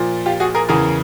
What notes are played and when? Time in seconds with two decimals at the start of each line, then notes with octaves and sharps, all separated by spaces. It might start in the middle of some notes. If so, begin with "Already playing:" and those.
Already playing: A#2 F3
0.26 F4 G4
0.40 F#4 G#4
0.54 G#4 A#4
0.69 E2 C#3 E3 G#4 A#4